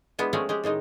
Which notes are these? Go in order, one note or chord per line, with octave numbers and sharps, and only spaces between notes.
G#3 B3 D4 E4
F3 G#3 A3 C4 C#4 G#4
G#3 G4 G#4
A2 D#3 G#3 D#4